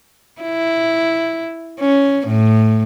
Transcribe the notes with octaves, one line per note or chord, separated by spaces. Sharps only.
E4
C#4
A2